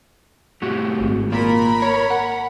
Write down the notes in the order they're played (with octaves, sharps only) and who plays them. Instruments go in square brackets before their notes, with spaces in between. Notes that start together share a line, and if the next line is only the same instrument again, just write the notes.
[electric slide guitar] A2 F#4 G4
[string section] G#1
[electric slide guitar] A#3 F4 [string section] A#4 B5
[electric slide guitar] C#5
F#5